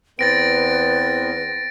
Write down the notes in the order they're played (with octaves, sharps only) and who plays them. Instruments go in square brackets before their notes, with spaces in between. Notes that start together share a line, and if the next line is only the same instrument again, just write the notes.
[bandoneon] E2 B3 C4 [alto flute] B4 [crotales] A6 A#6 D7